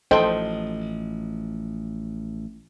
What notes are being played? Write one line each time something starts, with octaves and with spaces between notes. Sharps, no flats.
A1 F3 A4 C5 D#5 G5